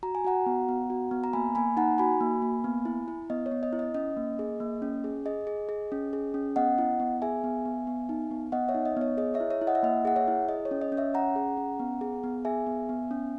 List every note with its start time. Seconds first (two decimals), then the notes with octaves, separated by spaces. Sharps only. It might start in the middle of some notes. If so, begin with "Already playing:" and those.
0.03 F#4 A#5
0.15 G#5
0.25 F#4 F#5 A#5
0.46 B3
0.69 B3
0.90 F#4
1.11 B3
1.24 A#5
1.33 A#3 G#5 B5
1.55 A#3 G#5 B5
1.77 D#4 F#5 A#5
1.98 F#4 G#5 B5
2.20 A#3
2.42 A#3
2.64 B3
2.85 E4
3.08 E4
3.30 B3 D#5
3.46 C#5
3.51 B3
3.63 D#5
3.73 E4
3.79 D#5
3.94 C#4 D#5
4.17 A#3
4.39 G#4
4.60 A#3
4.82 C#4
5.04 G#4
5.26 G#4 D#5
5.47 G#4
5.69 G#4
5.92 C#4
6.13 G#4
6.34 C#4
6.56 B3 D#5 F#5
6.78 E4
7.00 B3
7.22 G#4 E5 G#5
7.44 B3
7.65 B3
7.87 B3
8.09 D#4
8.31 B3
8.52 B3 D#5 F#5
8.68 C#5 E5
8.74 D#4
8.85 D#5
8.97 B3 C#5
9.17 G#4 D#5
9.34 C#5 E5
9.40 E4
9.50 C#5 E5
9.61 E4
9.67 D#5 F#5
9.75 E5
9.83 A#3 D#5
10.05 G#4 F#5
10.16 C#5 E5
10.28 E4
10.48 G#4 D#5
10.65 C#5
10.71 C#4
10.82 D#5
10.92 C#4
10.97 C#5 E5
11.14 C#4 F#5 A#5
11.36 G#4
11.57 C#4
11.79 B3
12.01 G#4
12.24 B3
12.45 G#4 E5 G#5
12.67 B3
12.89 B3
13.11 C#4